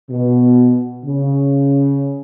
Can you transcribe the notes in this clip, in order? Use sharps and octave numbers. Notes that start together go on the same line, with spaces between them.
B2
C#3